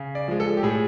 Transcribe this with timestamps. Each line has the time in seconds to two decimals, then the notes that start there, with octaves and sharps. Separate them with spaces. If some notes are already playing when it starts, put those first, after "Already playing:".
Already playing: C#3
0.15 D5
0.28 F3 G#3
0.40 A4
0.57 G4
0.63 A2 G#4